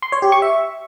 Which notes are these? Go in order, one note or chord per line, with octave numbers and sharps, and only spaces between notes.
C6
C#5
G4
C#6
E5